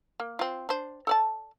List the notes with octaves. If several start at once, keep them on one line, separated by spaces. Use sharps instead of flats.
A#3
C4 F4
D4 C5
A4 D5 A5